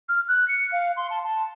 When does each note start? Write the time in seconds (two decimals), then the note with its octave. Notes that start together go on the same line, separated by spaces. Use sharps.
0.09 F6
0.28 F#6
0.48 C#7
0.72 F5
0.97 C6
1.10 A5
1.24 A5